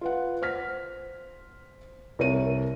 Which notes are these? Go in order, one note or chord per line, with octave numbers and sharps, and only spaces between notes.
F4 B4 F#5
C5 F6 B6
C2 A#4 C#5 D#7